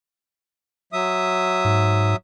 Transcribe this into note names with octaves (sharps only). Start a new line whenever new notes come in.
F#3 E5 D#6
G#2